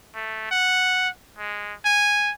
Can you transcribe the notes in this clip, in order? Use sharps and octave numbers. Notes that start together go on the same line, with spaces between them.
A3
F#5
G#3
G#5